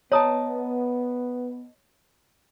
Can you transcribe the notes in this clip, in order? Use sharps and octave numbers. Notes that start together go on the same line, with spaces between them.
B3 C#5 D#5 A5 A#5 D#6